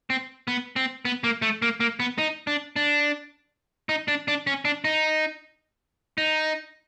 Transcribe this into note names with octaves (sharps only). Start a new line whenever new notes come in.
C4
B3
C4
B3
A#3
A3
A#3
A#3
B3
D#4
D4
D4
D#4
D4
D4
C#4
D4
D#4
D#4